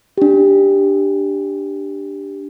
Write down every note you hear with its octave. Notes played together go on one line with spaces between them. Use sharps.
D4 G4